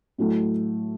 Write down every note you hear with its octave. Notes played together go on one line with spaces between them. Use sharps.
A2 F#3 A3